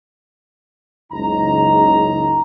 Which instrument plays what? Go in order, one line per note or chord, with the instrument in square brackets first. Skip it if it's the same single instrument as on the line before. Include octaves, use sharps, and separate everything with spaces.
[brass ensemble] F#1 C#2 C#3 D#4 A#5